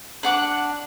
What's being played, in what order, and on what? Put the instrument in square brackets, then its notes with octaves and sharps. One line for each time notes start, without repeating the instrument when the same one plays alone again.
[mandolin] D4 F#5 D6